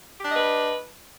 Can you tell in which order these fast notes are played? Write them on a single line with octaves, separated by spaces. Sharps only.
G4 D4 D#5 B4